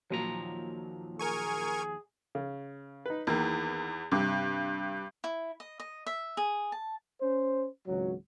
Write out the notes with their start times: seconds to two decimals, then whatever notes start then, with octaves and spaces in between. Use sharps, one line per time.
0.10 D#2 A#2 F3 F#3 A#5
1.19 G#4 A#4 G#5 C#6
2.35 C#3
3.06 D#4 B4
3.27 E2 D#3 E3 A#3
4.12 G2 C3 D6
5.24 E4
5.60 D#5
5.80 D#5
6.06 E5
6.37 G#4
6.72 A5
7.21 C#4 C5
7.86 G#1 C#2 F#3